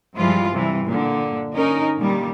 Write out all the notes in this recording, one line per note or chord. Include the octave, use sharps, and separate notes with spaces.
G2 E3 F3 G3 G#3 F4
C3 E3 G3
A#2 D3
C#4 D#4 A#4
A#2 D#3 G3